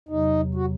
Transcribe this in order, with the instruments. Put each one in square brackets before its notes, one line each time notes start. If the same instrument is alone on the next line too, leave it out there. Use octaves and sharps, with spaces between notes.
[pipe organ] E2 C3 F#3 [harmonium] D#4
[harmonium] F#4